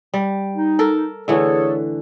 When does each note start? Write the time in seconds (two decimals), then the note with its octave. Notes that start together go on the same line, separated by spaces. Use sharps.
0.14 G3
0.55 D#4
0.79 A4 A#4
1.28 D3 E3 A3 G#4 A4 C#5